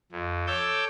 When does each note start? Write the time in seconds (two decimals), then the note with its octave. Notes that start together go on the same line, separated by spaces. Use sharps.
0.12 F2
0.47 A4 C#5 D6 E6 G6